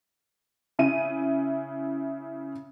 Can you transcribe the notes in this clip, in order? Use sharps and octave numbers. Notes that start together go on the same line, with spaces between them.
C#3 E4 D#7